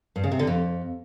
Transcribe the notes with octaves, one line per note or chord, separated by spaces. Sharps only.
G2
C#3
C3
D3
F2